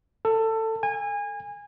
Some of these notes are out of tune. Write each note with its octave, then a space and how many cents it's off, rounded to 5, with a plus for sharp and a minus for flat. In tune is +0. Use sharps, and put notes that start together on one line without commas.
A4 +20
G#5 -25